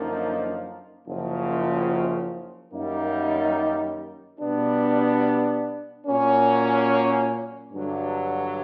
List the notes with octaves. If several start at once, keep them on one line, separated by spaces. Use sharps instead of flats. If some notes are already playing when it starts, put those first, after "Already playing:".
Already playing: F#2 D3 F3 A#3 D#4
F#1 F#2 C#3 F3
F#2 D#3 G3 A#3 D#4
B2 G3 B3 D4
A#2 F#3 A#3 C#4
G2 D3 F#3